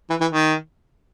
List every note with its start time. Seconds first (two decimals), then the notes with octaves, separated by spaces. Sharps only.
0.10 E3
0.21 E3
0.31 D#3